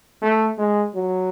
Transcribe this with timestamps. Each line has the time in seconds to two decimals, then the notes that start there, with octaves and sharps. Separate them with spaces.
0.22 A3
0.58 G#3
0.95 F#3